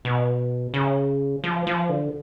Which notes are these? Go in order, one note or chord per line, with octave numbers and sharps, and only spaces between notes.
B2
C#3
F3
F3
D3